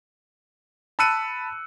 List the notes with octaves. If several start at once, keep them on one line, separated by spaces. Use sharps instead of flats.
A5 B5 E6 F#6 C#7 D#7